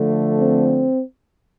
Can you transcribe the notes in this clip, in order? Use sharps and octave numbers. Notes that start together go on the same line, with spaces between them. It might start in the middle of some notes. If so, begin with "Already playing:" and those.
Already playing: D3 F3 A3
C4